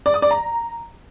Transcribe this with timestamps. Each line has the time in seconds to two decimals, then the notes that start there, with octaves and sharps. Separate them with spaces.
0.06 D5
0.14 D#6
0.22 D5
0.31 A#5